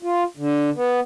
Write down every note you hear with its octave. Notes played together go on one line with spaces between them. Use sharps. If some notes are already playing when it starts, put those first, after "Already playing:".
F4
D3
B3